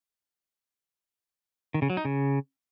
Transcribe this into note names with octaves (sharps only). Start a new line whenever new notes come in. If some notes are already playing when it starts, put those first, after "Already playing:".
D#3
C#3
F#3
D#4
C#3